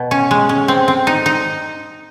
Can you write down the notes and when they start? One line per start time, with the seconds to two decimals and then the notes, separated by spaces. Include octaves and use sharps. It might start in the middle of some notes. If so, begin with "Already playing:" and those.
Already playing: B2
0.11 C#4
0.31 G#3
0.49 C#4
0.68 C4
0.88 C4
1.07 D#4
1.26 D#4